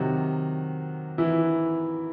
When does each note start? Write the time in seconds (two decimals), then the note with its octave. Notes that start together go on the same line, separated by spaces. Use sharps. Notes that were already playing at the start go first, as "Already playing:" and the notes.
Already playing: C3 D#3 F#3 F#4
1.18 E3 E4